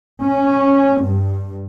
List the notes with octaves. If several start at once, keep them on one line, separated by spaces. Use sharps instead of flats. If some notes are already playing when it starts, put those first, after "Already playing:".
C#4
G2